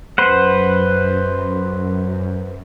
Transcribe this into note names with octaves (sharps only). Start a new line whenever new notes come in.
F#2 B4 C5 F#5